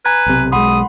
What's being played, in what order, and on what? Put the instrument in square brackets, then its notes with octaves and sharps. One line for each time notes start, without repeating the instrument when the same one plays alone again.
[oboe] B4 [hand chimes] G#5 A#5 G#6
[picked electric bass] B1 C3
[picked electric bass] B1 G#3 [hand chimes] F#5 B5 C6 [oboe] D#6